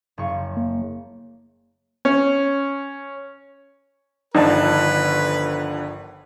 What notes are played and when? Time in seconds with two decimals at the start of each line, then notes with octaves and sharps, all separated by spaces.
0.18 F#1 C#6
0.57 A#3
2.05 C#4
4.35 G1 D3 D#3 F3 D#4 B4 A5